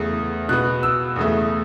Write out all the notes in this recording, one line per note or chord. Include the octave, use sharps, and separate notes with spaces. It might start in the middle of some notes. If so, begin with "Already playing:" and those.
Already playing: E2 C#3 A3
B2 B3 F#6
E6
E2 C#3 A3